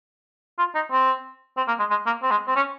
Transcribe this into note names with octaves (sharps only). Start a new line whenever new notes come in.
F4
D#4
C4
C4
A#3
G#3
G#3
A#3
C4
G#3
C4
C#4